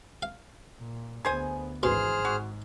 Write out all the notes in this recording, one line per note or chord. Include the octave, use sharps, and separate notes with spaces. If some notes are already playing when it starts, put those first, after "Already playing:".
F5
A#2
D2 B3 G#4 C5 G#5
G#1 D2 B2 E3 G#4 C5 C6 F6
G#2 F#4